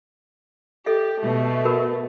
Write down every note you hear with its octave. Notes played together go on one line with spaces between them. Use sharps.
G4 A4 D#5 E5
B2 A3
F#4 A#4 B4